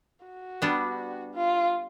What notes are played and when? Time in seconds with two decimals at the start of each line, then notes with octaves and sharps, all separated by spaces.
0.26 F#4
0.62 G3 B3 D4
1.34 F4